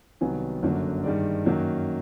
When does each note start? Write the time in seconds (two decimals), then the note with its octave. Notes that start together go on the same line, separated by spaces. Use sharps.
0.21 C2 C3 D#3 F#3 B3 G#5
0.62 G1 F#2 D3 F#3 A#3
1.03 G2 D#3 G#3 D5
1.45 F#2 D#3 F#3 A#3